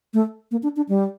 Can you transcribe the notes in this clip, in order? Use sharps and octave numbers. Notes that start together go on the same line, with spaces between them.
A3
A#3
D4
D4
G3